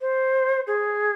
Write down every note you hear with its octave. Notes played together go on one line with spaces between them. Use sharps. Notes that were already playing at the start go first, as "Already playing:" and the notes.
C5
G#4